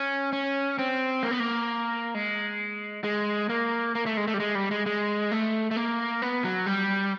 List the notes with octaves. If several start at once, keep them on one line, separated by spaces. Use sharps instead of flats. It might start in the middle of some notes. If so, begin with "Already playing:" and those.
Already playing: C#4
C#4
C4
A#3
B3
A#3
G#3
G#3
A#3
A#3
A3
G#3
A3
G3
G#3
G3
G#3
G#3
A3
A3
A#3
B3
F#3
G3